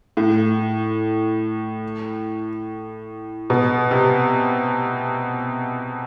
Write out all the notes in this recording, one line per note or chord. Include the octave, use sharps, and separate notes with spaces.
A2
B2
C3